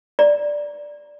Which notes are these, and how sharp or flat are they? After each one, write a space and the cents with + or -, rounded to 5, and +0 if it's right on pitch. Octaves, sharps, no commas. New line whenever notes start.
D5 +0 A#5 +10